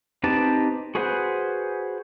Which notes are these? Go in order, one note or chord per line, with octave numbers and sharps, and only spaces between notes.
C4 D#4 G4 B4 A5
F#4 G#4 B4 C5 F#5